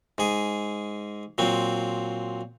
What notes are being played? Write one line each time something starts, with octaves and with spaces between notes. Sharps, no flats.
G#2 G#4
A#2 F#3 C4